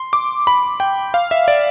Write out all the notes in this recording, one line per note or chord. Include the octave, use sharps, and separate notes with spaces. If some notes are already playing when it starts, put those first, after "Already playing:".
Already playing: C6
D6
B5
G5
F5
E5
D5